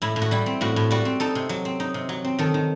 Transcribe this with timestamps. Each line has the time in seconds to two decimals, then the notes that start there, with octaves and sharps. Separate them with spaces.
0.02 A2 E4
0.16 A2
0.22 F#4
0.31 G3 E4
0.46 C4
0.61 A2 F#4
0.76 A2
0.91 G3 F#4
1.05 C4
1.20 D#4 A4
1.35 C3
1.49 F#3
1.65 C4
1.80 D#4
1.94 C3
2.09 F#3
2.25 C4
2.39 D#3 A4
2.54 D#3